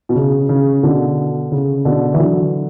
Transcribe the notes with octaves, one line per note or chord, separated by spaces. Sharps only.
B2
C#3
C#3
B2 D3
C#3
B2 D3
E3
D3 F#3